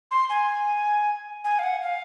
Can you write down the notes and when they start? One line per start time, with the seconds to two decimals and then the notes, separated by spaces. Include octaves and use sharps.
0.11 C6
0.29 G#5
1.44 G#5
1.59 F5
1.63 F#5
1.82 F5